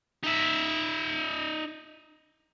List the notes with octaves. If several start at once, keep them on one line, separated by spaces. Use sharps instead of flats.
D#4 E5